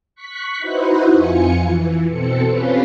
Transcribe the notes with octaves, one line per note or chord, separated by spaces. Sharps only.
C#6 F#6 B6
D#4 E4 F#4 B4 C5
F2 F4 G#5 C#7
E3
B2 C4 A4 C#7
C4 C#4 F4 G4 B4